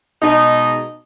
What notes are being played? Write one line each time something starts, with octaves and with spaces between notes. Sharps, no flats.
B2 G#3 D#4